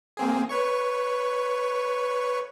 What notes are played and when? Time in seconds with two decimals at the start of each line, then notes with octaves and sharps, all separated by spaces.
0.17 A#3 C4 G#4
0.49 B4 C#5 C#6